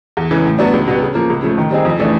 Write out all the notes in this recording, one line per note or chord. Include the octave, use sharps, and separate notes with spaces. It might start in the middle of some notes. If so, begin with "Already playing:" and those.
E2
C#3 E3 G#3
A2
F#3 B3 D4 F#4
C#2
B2 G3 B3
C#3
F3 A#3
C#2
C#3 F3 A3
D#3
G3 C4 D#4 G#4
F2
C#3 E3 A3 D4